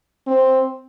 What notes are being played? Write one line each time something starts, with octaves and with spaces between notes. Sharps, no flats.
C4